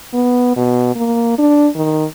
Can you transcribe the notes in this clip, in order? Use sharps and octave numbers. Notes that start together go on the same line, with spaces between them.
B3
B2
A#3
D4
D#3